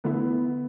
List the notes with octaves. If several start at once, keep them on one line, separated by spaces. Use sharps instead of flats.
D3 A3 B3 E4